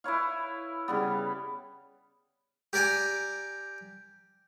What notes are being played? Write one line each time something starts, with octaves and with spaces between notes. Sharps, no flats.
E4 B4 C#5 F5
C#3 G3 B3
G4 A#4 D5 G5 G#5